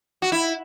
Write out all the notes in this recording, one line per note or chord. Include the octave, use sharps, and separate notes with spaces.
F#4
E4